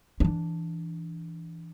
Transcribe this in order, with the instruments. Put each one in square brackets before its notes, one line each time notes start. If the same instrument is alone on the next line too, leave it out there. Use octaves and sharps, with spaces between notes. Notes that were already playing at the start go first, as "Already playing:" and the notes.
[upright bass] E3 D4